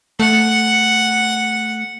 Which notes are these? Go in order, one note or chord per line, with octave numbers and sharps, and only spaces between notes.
A3 F#5